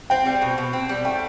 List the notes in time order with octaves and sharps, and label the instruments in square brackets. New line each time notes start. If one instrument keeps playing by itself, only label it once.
[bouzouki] C4 [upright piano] G5
[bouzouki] G3
B2
B2
C4
G3
[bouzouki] A3 [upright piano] G5